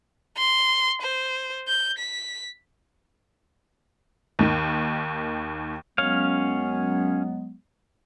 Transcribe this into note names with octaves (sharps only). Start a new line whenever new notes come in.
C6
C5
G6
B6
D#2 D#3
F#2 F#3 G#3 B3 C#4 C#5 F5